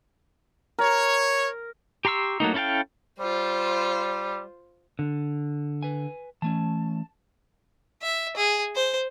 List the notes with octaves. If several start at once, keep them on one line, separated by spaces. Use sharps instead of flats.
A#4 C#5
G4 A#5 C6 C#6 E6
F#3 A3 A#3 D#4
C#4 E4 A4 F5 G5
G3 F4 C5
D3
B4 G#5
E3 A3 C#4 A5
E5
G#4
C5